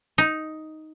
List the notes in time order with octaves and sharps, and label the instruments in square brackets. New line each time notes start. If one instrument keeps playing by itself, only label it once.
[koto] D#4